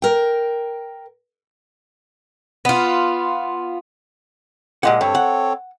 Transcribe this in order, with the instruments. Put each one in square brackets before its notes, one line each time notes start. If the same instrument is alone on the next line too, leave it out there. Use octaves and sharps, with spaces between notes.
[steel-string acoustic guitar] A#4 G5
[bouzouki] B3 F4
[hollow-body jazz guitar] A#2 G#3 F#5 [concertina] G4
[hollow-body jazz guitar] G2 [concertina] C4 A4 C#5
[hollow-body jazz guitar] F#5